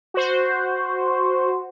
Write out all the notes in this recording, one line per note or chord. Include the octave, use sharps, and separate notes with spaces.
F#4 C5